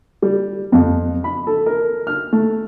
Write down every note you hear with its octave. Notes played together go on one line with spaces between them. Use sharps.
G3
F2
B5
A4
A#4
F6
A3